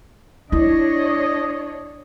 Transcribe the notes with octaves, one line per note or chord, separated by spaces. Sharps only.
D4 E4 C#5 D#5